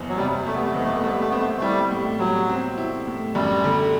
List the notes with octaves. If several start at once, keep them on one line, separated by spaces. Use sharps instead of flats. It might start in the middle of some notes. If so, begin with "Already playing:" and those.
Already playing: F#1 E2
F#3
C3 G3
G3 A3
B3
A3
F#1 B3
A3
B3
G3 A3
B3
A3
B3 C4
A3
A3
G3 E4
A2
F#3 G3
C4
E4
A2
F#2 G3
D3